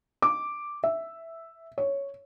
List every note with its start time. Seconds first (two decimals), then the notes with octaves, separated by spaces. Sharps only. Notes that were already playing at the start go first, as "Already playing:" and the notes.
0.22 D6
0.84 E5
1.78 C#5